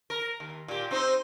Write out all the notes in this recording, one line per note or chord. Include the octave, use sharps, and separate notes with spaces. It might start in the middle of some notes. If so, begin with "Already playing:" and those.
A#4
D#2
A#2 G4
C4 D#4 C5